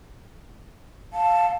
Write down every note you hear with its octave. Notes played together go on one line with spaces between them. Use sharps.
F5 A5